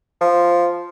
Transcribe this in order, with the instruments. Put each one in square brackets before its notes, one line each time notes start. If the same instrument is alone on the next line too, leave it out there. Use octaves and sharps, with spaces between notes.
[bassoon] F3